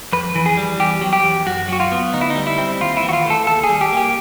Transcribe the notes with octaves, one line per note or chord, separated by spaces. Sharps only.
F2 B4
E3
G#4
G3
E2 G4
F#3
G4
E2
F#2 F#4
F#3 F#4
F4
B3
D2 D#4
E4
D#4
G3
E4
C4
D#2 F4
E4
E3
F#4
F4
A3 A4
D#2 A4
G#4
G3
G4
A#3 G4